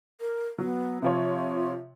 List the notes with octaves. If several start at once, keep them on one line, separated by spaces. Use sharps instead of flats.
A#4
F#3 B3
C3 F3 F4 C#5